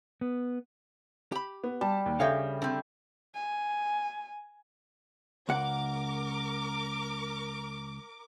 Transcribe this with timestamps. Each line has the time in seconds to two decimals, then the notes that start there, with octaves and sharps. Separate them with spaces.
0.21 B3
1.32 G4 B5
1.64 B3
1.81 G3 A5
2.06 D#2
2.20 C#3 D4 G4 A4 C#5 E5 F5 G6
2.62 D3 C4
3.34 G#5
5.49 C#2 A#4 F#5 D6